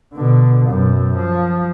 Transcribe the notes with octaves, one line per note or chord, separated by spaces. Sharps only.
B2 D3
F#2 B2
F3